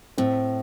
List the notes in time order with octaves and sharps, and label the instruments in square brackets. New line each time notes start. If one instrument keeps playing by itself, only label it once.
[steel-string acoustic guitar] A2 [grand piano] C4